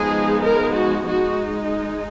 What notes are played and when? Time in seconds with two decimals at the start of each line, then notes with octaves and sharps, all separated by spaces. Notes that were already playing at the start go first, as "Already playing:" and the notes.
Already playing: F3 G#3 B3 D#4 G#4
0.43 A#4
0.75 F#4
1.07 G#3 D#4 F#4